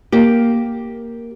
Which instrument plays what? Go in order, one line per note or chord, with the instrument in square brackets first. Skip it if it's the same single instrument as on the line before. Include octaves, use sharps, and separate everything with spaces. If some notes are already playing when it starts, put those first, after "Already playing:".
[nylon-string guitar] A#3 G4